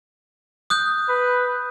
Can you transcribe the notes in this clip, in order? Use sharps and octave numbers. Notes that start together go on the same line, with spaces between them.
D#6 F#6 G6
B4